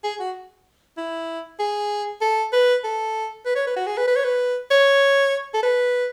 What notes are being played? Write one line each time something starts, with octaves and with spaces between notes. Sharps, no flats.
G#4
F#4
E4
G#4
A4
B4
A4
B4
C#5
B4
F#4
G#4
B4
B4
C#5
B4
C#5
A4
B4